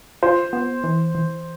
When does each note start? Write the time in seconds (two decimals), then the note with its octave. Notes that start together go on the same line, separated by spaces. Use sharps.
0.23 F4 C5
0.53 B3
0.84 E3
1.15 E3